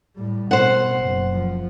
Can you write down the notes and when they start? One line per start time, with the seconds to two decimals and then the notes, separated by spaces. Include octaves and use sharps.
0.16 A2 G3
0.51 B2 C5 F#5
0.99 F#1
1.33 F3